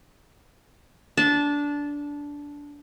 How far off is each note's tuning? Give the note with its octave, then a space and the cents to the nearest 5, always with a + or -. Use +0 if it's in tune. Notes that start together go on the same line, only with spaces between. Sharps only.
D4 -15 A5 -15